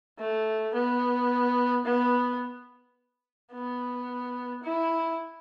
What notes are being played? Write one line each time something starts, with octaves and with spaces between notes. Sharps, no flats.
A3
B3
B3
B3
E4